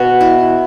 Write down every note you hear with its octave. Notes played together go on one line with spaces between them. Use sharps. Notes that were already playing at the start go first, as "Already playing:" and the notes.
Already playing: B2 F#4
E4